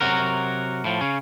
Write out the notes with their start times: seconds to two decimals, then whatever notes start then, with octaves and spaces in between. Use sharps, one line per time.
0.01 C3 F#3 F#4 A#4
0.85 A2 F3
1.01 C#3 C#4